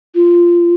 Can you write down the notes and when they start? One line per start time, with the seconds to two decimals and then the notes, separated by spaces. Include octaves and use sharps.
0.15 F4